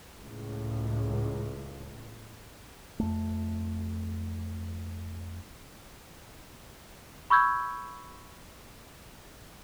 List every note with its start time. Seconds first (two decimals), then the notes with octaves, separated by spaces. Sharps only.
0.20 C#2 A2
3.00 F2 A3
7.30 B5 C#6 E6 G6 G#6